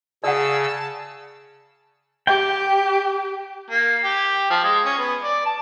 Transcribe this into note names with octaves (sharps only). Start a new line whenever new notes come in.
C#3 G#4 D5 F#5 A5 E6
G4 G5
A#3
G4
F3
G#3
C#4
B3
D5
A5